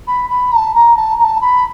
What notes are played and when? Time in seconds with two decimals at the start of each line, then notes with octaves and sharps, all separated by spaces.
0.07 B5
0.29 B5
0.52 A#5
0.56 A5
0.74 A#5
0.96 A5
1.18 A#5
1.23 A5
1.40 B5